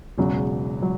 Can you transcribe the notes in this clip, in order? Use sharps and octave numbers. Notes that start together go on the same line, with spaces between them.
E1 E2 C#3 F#3
F#3